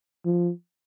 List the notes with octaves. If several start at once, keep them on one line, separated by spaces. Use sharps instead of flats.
F3